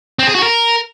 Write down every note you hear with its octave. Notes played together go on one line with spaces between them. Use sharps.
C4
G#4
F#4
A#4